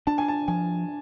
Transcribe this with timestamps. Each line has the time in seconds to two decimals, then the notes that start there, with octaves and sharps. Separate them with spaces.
0.07 D4 A5
0.18 G#5
0.28 A5
0.48 F3 G#5